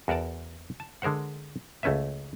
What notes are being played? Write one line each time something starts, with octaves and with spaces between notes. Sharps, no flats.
E2 F#4 A#4 D5 A5
A5
D3 G#3 A#4 C5 F#5
C#2 A3 C#4 B4 E5